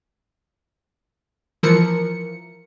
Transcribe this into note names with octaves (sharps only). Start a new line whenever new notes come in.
E3 F3 A#4 C#7